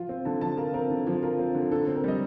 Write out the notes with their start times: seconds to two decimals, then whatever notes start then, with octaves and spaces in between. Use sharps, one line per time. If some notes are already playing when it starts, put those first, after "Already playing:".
Already playing: F3 F4
0.09 C4
0.25 D3 A5
0.41 F3 A5
0.57 F4 A#4
0.74 C4 A#4
0.90 D3
1.07 F3
1.23 F4 A#4
1.39 C4
1.55 D3
1.71 D3 A4
1.88 C4
1.96 A#4
2.04 G3 D#5